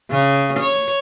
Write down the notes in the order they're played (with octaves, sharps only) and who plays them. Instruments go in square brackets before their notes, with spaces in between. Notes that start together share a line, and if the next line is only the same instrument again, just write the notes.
[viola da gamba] C#3
C#5